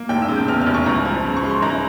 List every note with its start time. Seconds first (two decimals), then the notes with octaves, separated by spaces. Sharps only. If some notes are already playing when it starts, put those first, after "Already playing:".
Already playing: A#3
0.09 F1 G5
0.22 E6
0.28 C#3
0.36 G6
0.48 E2 F6
0.61 F6
0.67 F1
0.74 C#6
0.86 C#2 A#5
1.05 F3
1.25 C#3
1.36 C#6
1.43 G#3
1.50 C6
1.62 C#2 A#5